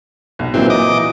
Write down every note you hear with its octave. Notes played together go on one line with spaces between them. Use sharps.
B1
A#2 E3 F#3 C4
D#5 D6